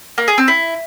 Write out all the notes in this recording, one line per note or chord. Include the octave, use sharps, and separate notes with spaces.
A#3
G#4
C4
E4